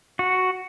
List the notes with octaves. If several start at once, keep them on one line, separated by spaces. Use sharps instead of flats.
F#4